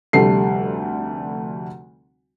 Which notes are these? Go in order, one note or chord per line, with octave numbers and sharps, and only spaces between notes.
F1 D2 G3 A3 C7